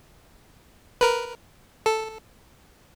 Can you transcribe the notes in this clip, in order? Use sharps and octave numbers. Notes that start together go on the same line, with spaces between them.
A#4 B4
A4